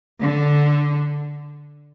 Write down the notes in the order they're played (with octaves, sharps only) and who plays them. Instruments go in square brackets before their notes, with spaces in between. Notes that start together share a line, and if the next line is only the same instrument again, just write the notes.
[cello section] D3